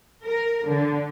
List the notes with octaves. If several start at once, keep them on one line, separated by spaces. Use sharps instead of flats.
A#4
D3